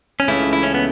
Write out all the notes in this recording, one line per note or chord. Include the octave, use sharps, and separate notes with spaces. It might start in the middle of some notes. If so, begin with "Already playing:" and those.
C#4
C#2 C#3 E3 A3 E4
E4
C#4
B3